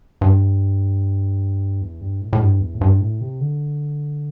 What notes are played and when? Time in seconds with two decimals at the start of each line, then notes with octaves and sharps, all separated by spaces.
0.21 G2
1.82 E2
2.01 G2
2.21 A2
2.33 A2
2.40 G2
2.60 E2
2.74 A2
2.81 G2
3.00 A2
3.21 C3
3.40 D3